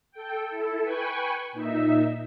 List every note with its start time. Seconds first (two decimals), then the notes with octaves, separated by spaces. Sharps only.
0.11 A4 G5
0.46 E4 A4
0.83 B4 G5 G#5 B5 C#6
1.52 A#2 D#4 E5